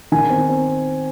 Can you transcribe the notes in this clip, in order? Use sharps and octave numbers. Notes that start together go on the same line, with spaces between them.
D#3 G#5
C4
C4